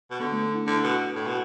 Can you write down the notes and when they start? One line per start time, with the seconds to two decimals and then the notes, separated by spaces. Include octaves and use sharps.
0.11 B2
0.20 D3 B3
0.32 A3
0.43 D4
0.55 E4
0.67 D3 D4
0.83 B2
1.16 A2
1.26 B2